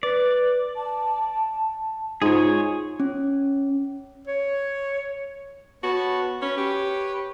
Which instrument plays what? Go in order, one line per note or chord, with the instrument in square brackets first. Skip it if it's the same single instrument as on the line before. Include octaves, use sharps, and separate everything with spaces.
[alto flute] B4 [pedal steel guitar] D5
[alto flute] A5
[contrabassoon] G#2 [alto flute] F4 [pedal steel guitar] G#4 C#5
[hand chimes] C#4
[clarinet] C#5
[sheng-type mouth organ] B3 C#5 A5 [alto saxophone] F#4
[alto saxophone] C#4 [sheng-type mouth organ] B4 C#5
[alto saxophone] G4